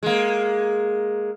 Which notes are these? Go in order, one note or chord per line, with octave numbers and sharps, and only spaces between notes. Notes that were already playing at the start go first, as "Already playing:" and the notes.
G#3 A#3